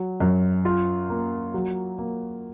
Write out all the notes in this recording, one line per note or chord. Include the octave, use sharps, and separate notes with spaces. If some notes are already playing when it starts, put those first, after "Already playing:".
Already playing: F#3
F#2
F4
A#3
F#3
A#3